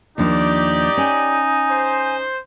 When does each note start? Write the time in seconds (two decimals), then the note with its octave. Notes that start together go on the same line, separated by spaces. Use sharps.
0.18 D#2 F3 D4 D#4 G4 D5
0.97 C#4 G#5
1.70 C5